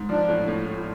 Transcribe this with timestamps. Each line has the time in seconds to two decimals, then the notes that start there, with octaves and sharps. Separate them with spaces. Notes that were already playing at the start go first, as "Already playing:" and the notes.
Already playing: G#2
0.09 F3 D4
0.29 A2
0.48 A2
0.66 A2